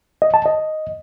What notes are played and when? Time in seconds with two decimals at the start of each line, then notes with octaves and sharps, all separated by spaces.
0.22 D#5
0.34 A5
0.46 D#5